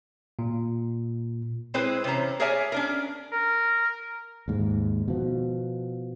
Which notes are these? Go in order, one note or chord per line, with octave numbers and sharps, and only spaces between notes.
A#2
G#3 C4 E4 G#4 B4 C5
C3 E3 C#4 C5 A#5
G#4 A#4 C#5 D5 E5 G#5
C#4 D4 A#4
A#4
D#2 G#2
B2 F3